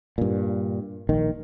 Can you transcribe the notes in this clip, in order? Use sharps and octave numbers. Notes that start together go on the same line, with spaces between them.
G2 A#2
A#1 D#3